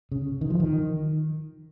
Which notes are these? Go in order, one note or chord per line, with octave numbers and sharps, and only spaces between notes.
C#3
D#3
F3
D#3